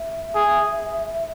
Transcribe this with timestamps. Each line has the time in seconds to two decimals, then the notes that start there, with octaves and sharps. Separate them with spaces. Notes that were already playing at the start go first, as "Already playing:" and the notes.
Already playing: E5
0.35 G#4